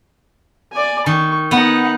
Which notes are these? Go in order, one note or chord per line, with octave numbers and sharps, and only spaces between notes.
D5 G#5
D#3 C#6
B3 D#4 F#5